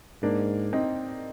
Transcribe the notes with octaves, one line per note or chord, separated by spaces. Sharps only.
G#2 A#3 D4
C4 D#4